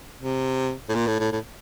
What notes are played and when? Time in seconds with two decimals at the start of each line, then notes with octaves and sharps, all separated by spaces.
0.21 C3
0.89 A2
0.95 A#2
1.07 A2
1.19 A2
1.32 A2